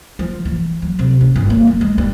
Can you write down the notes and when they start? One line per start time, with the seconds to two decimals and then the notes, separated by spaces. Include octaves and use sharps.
0.19 F3
0.45 E3
0.82 F#3
0.99 C3
1.21 C#4
1.36 G1
1.50 A#3
1.67 F#3
1.81 G#3
1.98 G2